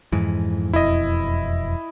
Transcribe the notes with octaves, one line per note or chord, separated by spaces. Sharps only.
F2 G#2 E3
E1 F2 E4 D#5